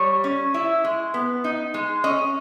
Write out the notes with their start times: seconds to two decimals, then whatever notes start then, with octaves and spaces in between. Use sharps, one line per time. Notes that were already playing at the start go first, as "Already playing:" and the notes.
Already playing: G3 C#5
0.24 C#4
0.54 E4
0.84 G#3
1.14 B3
1.44 D#4
1.74 G#3
2.04 C#4 D#5